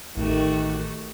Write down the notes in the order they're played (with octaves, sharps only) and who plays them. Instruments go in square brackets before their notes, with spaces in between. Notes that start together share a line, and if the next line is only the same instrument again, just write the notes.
[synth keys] A1 [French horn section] D#3 [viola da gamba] A3 F#4 G4